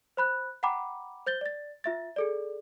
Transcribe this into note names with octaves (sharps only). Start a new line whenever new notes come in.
C5 B5 F#6
F#5 G5 A#5 B5 D6
C5 G6 A6 G7
D5 A6
F4 E5 A6
G#4 A4 D5